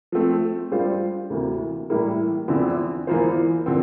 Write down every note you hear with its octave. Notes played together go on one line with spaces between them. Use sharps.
F3 A3 C4
G3 D4 F4 C5 F5
D2 C3 E3 A#3
A2 E3 G3 A#3 E4
E2 D3 F3 C4 E4
E2 E3 A#3 F4 C5
D3 F3 C4